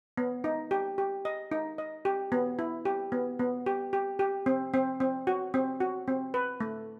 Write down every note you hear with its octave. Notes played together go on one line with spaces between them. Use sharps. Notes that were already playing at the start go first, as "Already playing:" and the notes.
B3
D#4
G4
G4
D#5
D#4
D#5
G4
B3
E4
G4
B3
B3
G4
G4
G4
C4
C4
C4
F#4
C4
F#4
C4
B4
A3